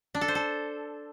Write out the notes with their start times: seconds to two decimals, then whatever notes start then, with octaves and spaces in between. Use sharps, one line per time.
0.15 D4
0.21 A4
0.28 C5
0.35 A4